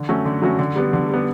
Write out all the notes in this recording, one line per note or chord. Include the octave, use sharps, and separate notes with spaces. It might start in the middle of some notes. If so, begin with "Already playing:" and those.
Already playing: D3
F#3 A3 C#4 F#4
D3
F#3 A3 C#4 F#4
D3
G3 B3
D3
G3 B3